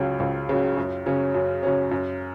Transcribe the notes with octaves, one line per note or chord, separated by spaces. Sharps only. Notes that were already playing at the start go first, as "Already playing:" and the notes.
Already playing: C#2 C#3 F#3
C#2
C#3 F#3
F#2
C#3 F#3 C#4
F#2
C#3 F#3 C#4
F#2